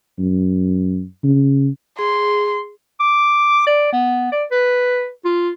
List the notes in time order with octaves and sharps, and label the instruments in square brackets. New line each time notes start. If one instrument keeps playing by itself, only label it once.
[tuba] F#2
C#3
[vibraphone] G#4 [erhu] C6
[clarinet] D6
D5
B3
D5
B4
F4